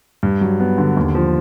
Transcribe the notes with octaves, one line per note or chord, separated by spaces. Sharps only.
G2
F#3
B3
D3
D#2
F3